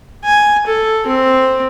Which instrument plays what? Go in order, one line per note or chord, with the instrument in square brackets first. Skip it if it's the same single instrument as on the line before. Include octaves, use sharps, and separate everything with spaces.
[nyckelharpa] G#5
A4
C4